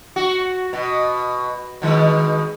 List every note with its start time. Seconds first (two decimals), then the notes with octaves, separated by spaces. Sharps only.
0.16 F#4
0.73 B2
1.82 B2 D#3 G#3